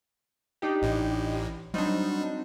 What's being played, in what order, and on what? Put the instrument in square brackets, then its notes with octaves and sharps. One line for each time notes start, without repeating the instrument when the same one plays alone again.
[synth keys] D4 D#4 G4
[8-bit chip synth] A1 A2
[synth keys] F#3 C4 D#4 [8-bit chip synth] G3 D4